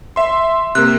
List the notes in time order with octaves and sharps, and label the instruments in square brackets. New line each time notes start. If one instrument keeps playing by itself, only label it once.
[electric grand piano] E5 C6
[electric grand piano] C3 A#3 [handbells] F#6